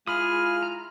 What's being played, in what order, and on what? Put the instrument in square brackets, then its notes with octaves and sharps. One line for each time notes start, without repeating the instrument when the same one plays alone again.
[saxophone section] G#3 E4 F4 [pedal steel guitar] G#4 B5 D#6 [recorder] F6
[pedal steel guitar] A#5